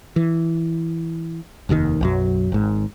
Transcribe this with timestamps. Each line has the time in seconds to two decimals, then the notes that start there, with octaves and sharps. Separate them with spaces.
0.16 E3
1.69 F1 D#2 G#2 D#3
2.01 B1 F#2 F#3
2.52 G#1 G#2